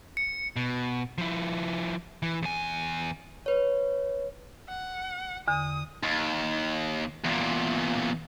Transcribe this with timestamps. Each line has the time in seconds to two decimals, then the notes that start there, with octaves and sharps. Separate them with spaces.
0.17 C#7
0.56 B2
1.18 F3 E4
2.22 E3
2.42 E2 G#5
3.46 B4 C#5
4.69 F#5
5.48 E2 D3 D#6
6.03 D#2
7.25 E2 A#2